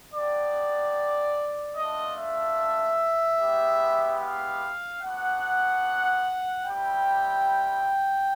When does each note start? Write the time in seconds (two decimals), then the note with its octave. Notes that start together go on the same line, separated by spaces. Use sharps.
0.14 B3 D4 G4 D5
1.76 A3 D4 F4 D#5
2.17 E5
3.39 G#3 B3 E4 G4
4.21 F5
5.02 B3 D4 F#4 F#5
6.64 G3 C4 E4 G4 G5